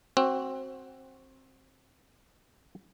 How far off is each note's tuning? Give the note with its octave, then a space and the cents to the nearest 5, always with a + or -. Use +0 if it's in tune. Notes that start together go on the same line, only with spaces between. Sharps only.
C4 +20 F#4 +10